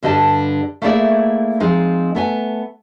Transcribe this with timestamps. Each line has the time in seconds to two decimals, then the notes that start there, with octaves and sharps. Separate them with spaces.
0.03 G2 D3 G4 D#5 A5
0.82 A3 A#3 E4 G#4 D5 E5
1.60 F3 G#3 C4 D#4
2.15 A3 B3 G#5